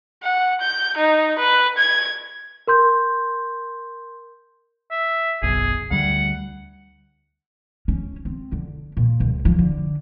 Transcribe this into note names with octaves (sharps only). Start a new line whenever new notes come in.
F#5
G6
D#4
B4
G#6
A#4 C6 G6
E5
F#1 B1 B2 G#4
D2 G3 F#5
C#4
C4
D3
A#2
C#2
F3
D3